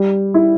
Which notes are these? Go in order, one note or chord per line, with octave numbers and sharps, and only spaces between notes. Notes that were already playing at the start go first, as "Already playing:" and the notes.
Already playing: G3
E4